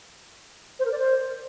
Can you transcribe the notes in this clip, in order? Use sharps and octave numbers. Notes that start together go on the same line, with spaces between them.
C5
A#4
D5
C5